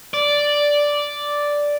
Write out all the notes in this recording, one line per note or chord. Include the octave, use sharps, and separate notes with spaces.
D5